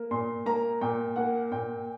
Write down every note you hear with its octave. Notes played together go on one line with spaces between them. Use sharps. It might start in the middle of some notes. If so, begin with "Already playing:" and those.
Already playing: A#3
A#2 C6
A#3 A#5
A#2 G5
A#3 F#5
A#2 G5